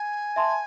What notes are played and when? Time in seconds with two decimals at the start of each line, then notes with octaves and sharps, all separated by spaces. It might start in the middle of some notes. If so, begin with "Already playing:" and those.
Already playing: G#5
0.36 E5 A5 C6